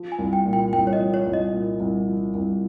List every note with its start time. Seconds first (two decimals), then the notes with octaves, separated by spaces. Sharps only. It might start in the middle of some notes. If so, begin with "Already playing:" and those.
Already playing: F3
0.12 G#5
0.19 C2
0.33 G5
0.45 A#2
0.53 G5
0.73 C2 G5
0.87 C#5
0.93 D#5
1.00 F3
1.14 C#5
1.26 C2
1.34 D#5
1.53 A#2
1.80 C2
2.08 F3
2.35 C2